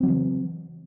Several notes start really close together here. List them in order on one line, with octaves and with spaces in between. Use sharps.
C4 F#3 C#3 E3